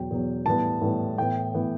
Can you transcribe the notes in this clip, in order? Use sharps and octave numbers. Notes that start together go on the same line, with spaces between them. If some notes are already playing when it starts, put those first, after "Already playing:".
Already playing: E2 B2 F#3 G5
E2 B2 F#3
A2 E3 G3 B3 A5
A2 E3 G3 B3
A2 E3 B3 G5
A2 E3 B3